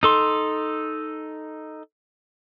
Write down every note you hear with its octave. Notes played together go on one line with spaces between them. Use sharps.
D#4 A4 C6